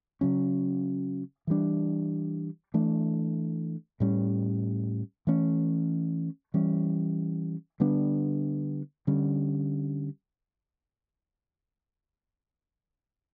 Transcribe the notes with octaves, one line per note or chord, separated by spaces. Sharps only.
C#3 F#3 C#4
E3 G3 D4
E3 A3 D4
A2 G3 C#4
E3 A3 C#4
E3 G3 C#4
D3 G3 B3 D4
D3 G3 C#4